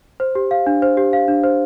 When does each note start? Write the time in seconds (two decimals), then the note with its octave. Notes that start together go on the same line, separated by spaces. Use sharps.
0.20 C5
0.35 G4
0.51 F5
0.67 D4
0.82 C5
0.97 G4
1.13 F5
1.28 D4
1.44 C5